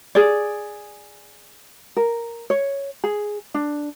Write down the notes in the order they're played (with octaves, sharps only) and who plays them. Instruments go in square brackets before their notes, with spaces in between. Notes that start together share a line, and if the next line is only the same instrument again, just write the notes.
[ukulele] G#4 D5
A#4
C#5
G#4
D4